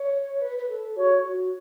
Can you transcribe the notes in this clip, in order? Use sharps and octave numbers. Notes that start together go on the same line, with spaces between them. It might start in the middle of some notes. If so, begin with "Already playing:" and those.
Already playing: C#5
B4
B4
A4
F#4 C#5
F#4